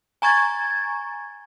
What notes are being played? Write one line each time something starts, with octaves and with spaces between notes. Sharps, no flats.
G#5 A#5 C#6 G#6 A6